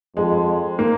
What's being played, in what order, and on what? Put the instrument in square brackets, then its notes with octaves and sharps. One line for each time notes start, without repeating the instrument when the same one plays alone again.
[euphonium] F2 [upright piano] G#3
[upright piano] A#3